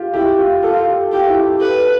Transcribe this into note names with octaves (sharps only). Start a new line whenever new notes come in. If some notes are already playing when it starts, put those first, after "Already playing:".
Already playing: F4 G4
E4 G4
F4
F4 A4
G4
F4 G4
E4
G4
A4 B4
A4